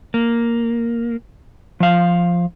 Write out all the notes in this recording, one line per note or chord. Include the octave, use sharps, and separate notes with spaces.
A#3
F3 F5